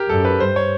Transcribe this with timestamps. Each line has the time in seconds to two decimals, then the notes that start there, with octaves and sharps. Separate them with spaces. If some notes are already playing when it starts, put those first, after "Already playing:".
Already playing: G4 A#4
0.08 F#2 A4
0.25 B4
0.40 G2 C5
0.56 C#5